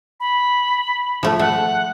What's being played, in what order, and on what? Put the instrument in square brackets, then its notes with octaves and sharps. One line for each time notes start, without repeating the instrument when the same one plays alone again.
[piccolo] B5
[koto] F3 A3
[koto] A3 [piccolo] F#5